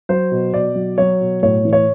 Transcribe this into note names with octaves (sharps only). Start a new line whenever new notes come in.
F#3 C5
B2
B2 D5
F#3
F#3 C#5
B2
A2 C#5
E3
C#5